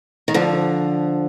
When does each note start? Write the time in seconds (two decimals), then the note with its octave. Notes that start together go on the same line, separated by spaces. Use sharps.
0.28 D#3
0.34 D3 F3